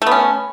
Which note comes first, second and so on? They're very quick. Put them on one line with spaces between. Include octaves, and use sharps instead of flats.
A3 B3 C#4